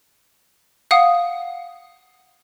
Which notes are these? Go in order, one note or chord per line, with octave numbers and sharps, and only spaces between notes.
F5 F#5 D#6